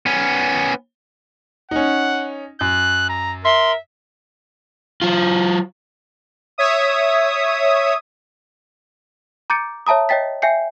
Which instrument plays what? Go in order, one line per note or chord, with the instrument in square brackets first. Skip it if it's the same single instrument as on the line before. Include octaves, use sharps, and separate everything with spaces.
[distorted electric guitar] B3 C#4
[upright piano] C#4 D#4 [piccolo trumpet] F#5
[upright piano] F#2 [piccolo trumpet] F#6
[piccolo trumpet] A#5
[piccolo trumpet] A#4 [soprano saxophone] E5 [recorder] C6
[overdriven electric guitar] F#3 F4
[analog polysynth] C#5 E5 D#6
[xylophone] A#5 D6 G6 A6 C#7 D7
C#5 E5 A5 A#5 D#6
C#5 D#5 G5 A6 B6
E5 G5 G#5 G6 C7 C#7